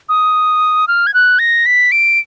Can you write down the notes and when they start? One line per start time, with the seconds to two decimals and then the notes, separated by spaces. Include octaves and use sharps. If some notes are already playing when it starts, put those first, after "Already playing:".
0.09 D#6
0.88 F6
1.07 G#6
1.14 F#6
1.39 A#6
1.66 B6
1.92 D7